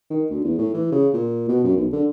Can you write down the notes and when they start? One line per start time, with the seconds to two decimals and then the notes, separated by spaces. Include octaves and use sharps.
0.10 D#3
0.30 D2
0.44 E2
0.58 A2
0.74 E3
0.92 C#3
1.14 A#2
1.48 B2
1.64 F#2
1.77 B1
1.92 D3